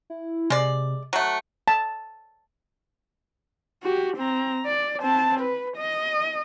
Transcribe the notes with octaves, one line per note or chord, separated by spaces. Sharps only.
E4
C3 G#3 D5
F#3 A3 F#6
A5
F#4 G4
C4 A#5
D5
C4 A5
B4
D#5